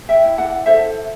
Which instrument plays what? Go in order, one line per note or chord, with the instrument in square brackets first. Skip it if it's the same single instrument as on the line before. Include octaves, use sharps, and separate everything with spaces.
[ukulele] E5 G5
E4
D5 F#5
A4 C5 E5